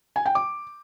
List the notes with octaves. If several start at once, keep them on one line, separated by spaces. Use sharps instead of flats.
G#5
G5
D6